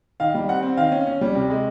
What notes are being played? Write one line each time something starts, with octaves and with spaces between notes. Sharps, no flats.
D#3 F5
G3
C4 F#5
C4
D#3 F5
C#4
C#4
G3
C3
G#3